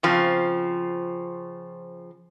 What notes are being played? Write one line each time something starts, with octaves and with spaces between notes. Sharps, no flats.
C#3 F3 C4